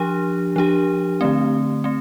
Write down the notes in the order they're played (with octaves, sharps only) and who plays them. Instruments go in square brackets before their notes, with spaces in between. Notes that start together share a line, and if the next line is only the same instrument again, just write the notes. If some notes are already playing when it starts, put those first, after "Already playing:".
Already playing: [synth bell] F3 D4 G4
F3 D4 G4
D3 A3 C4
A3 C4